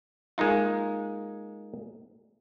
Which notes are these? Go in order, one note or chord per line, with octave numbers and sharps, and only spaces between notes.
G#3 A#3 D#4 F4